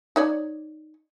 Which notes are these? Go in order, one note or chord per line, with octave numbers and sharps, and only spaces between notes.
D#4 C#5 D5